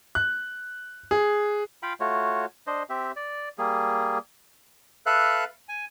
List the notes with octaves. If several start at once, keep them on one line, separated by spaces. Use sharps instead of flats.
F#6
G#4
F4 F5 G5 B5
A3 F4 F#4 C#5
D4 C5 D#5
C4 G4 E5
D5
G3 A#3 G#4
A4 B4 E5 F5 F#6
G#5